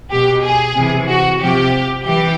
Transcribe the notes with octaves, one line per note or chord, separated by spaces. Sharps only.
B2 G4
G#4
C3 E3
F#4
C3 F3 G4
E3 G4